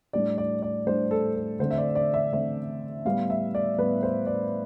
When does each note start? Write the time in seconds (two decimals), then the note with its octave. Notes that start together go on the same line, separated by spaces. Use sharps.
0.13 A2 G3 D4 D5
0.38 D5
0.62 D5
0.86 A2 G3 D4 C5
1.11 A4
1.36 A4
1.59 D3 A3 C4 C5
1.71 E5
1.78 D5
1.95 D5
2.14 E5
2.32 D3 A3 C4 E5
3.05 A2 G3 B3 F5
3.30 E5
3.55 D5
3.78 A2 G3 B3 B4
4.03 C5
4.26 D5